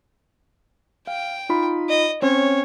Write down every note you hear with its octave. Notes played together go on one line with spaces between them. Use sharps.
F5 G5
D#4 F4 B5
D#5
C4 C#4 C5 C#5